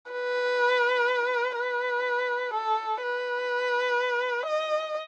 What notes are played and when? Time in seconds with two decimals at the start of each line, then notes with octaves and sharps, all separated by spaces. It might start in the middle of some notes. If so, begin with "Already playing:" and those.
0.12 B4
1.57 B4
2.53 A4
3.02 B4
4.46 D#5